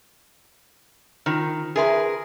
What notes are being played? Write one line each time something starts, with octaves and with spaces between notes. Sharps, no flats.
D#3 E4 F4 C5
D#4 G#4 A#4 B4 E5 C6